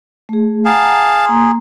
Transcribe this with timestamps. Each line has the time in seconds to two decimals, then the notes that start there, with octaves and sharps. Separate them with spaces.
0.29 A3 G#4
0.65 G#4 F5 F#5 A5 A#5
1.25 A#3 A#5 C6